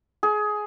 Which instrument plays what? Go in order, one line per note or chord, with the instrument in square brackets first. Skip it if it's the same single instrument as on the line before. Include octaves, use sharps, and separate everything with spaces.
[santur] G#4